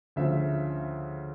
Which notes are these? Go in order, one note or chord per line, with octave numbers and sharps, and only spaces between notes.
D2 C#3 F3 E5